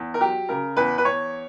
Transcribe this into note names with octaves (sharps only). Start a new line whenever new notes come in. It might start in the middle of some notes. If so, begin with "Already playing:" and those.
Already playing: E2
A#4
F#3 G4
C#3 A#4
E2 B4
B4
E2 C#5